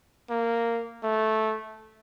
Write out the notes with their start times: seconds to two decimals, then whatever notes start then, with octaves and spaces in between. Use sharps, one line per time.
0.30 A#3
1.03 A3